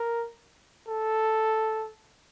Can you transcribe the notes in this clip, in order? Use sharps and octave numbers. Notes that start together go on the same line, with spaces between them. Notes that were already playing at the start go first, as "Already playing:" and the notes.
Already playing: A#4
A4